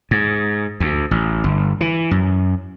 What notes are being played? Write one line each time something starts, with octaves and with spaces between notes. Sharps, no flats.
G#2
D2
A1
G1
E3
F#2